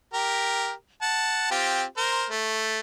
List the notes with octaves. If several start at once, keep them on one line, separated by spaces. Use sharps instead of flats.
G4 A#4
F#5 A5
C4 F4 G4
A#4 C5
A3